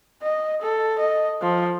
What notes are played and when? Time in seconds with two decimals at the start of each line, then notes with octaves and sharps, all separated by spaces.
0.22 D#5
0.62 A4
0.98 D#5
1.42 F3